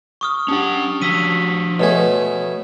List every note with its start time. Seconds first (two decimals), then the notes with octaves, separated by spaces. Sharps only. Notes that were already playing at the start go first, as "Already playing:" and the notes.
0.21 C#6 D#6 F6
0.48 C#4 D4 G4 F#5 G5
1.01 F3 F#4 E6 B6 D#7
1.80 B2 A3 G#4 C#5